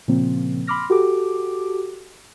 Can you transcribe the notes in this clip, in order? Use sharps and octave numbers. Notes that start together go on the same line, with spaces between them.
A#2 C#3 F3 A#3 C4
B5 C6 D6 F6 A#6
F#4 G4 A4 D6